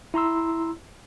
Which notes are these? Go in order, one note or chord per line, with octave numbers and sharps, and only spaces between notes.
E4 A#5 C6 E6